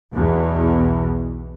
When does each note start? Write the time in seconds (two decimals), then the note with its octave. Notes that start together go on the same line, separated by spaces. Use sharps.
0.14 B1 E2 B2